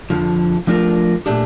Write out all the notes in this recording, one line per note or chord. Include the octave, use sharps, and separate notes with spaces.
F2 D3 F3
F3 A3 D4 F4 A#4
A#2 A3 D4 G4